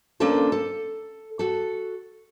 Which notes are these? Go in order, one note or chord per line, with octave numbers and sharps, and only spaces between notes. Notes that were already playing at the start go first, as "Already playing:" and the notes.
A#3 C#4 D4 F4 A4 C5
A4
F#4 A4